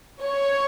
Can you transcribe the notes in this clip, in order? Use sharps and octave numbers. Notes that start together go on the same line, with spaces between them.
C#5